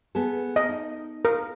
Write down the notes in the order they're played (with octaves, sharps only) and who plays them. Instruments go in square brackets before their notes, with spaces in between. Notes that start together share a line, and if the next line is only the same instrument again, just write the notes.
[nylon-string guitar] B3 G#4 A4
[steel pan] D#5
[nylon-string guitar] D#4
[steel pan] A#4